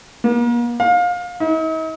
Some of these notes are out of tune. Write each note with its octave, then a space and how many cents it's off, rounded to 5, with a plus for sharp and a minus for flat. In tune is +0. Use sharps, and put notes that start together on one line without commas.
A#3 +40
F5 +25
D#4 +45